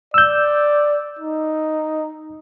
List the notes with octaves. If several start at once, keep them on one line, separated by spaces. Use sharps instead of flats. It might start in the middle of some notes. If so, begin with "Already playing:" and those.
D5 E6 G6
D#4